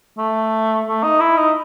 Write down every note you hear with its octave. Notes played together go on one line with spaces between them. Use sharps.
A3
A3
D#4
E4
D#4